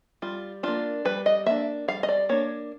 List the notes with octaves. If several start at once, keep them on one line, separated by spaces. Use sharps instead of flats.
G3 F4
A#3 D4 F4
G3 B4
D#5
A#3 D4 E5
G3 F5
D#5
D5
A#3 D4 C#5